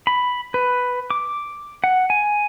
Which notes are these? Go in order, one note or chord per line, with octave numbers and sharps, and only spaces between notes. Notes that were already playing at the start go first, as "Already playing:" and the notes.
B5
B4
D6
F#5
G#5